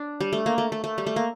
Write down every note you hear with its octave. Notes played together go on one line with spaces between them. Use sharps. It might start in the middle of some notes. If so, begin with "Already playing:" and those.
Already playing: D4
G3
A3
A#3
A3
A3
A3
G3
A3
A#3